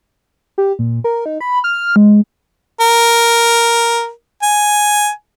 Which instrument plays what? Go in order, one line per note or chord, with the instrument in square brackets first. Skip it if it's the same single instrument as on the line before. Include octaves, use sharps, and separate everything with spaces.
[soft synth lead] G4
A#2
A#4
D#4
B5
F6
G#3
[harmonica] A#4
G#5